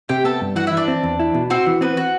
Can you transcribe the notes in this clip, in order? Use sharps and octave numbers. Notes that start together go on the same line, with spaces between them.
C3 G4 G5
B3 A4 A5
G2
E3 F#4 F#5
E4 E5
E3 D4 D5
C4
E2
E4
B2
C4 F#4 C5
E3
B3 C4 B4
F#4